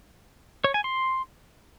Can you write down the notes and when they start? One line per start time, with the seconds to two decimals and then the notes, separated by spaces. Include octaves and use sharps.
0.64 C#5
0.74 G#5
0.84 C6